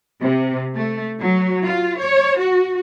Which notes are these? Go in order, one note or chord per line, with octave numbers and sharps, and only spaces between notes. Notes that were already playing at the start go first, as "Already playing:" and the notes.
C3
A3
F#3
F4
C#5
F#4